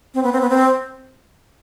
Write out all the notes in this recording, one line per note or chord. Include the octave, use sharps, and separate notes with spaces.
C4
B3
C4
B3
C4